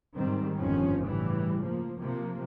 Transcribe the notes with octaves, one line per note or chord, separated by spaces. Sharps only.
G#2 D#3 G3 C4
G1 F2 A#2 D#3 F3 C#4
A2 C#3 E3 G3
F3 A#3
C3 F3 A#3